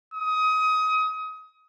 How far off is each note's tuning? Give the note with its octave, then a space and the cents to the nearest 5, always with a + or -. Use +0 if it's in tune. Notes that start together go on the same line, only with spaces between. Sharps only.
D#6 +25